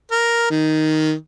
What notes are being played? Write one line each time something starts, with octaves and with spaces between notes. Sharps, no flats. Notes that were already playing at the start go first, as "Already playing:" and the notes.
A#4
D#3